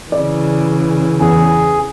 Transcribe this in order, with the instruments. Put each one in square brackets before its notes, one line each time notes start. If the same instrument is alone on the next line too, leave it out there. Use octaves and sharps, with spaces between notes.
[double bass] C#3 E3 [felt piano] D5
[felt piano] E2 [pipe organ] G#4